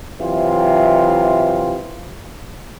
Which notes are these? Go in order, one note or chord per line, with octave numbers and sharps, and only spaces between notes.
C3 E3 F#3 F4